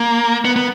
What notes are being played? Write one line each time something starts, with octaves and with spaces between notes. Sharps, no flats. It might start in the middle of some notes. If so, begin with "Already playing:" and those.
Already playing: A#3
B3
B3